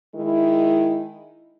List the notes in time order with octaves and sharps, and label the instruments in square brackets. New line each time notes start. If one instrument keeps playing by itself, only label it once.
[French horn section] D#3 G#3 E4